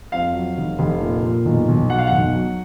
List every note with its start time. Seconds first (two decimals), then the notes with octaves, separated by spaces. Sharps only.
0.12 F2 F5
0.34 F#3
0.58 F1
0.79 F1
1.01 A#2
1.24 A#2
1.45 B1
1.68 B1
1.89 F#3 F#5
1.99 F5
2.07 B1 F#5
2.35 F#3